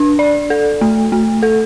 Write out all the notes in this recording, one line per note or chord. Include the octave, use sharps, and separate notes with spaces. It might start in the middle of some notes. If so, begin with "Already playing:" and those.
Already playing: D4
D5
A4
A3
A3
A4